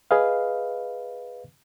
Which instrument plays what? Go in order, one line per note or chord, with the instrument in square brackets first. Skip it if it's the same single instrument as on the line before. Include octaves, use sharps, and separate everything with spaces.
[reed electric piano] G#4 B4 D#5 F5